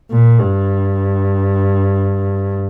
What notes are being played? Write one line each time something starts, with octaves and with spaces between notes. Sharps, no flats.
A#2
G2